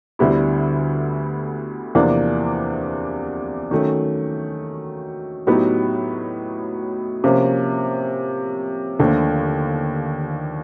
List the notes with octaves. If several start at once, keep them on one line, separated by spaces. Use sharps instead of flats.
D2 D3 G3 B3 E4
E2 C3 F3 A#3 D4
D#3 F#3 A3 C#4
A2 F#3 B3 D#4 G4
C3 F3 A#3 C#4
D#2 D3 F3 A3 D4